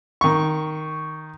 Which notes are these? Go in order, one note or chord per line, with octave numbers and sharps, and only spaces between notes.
D#3 C#6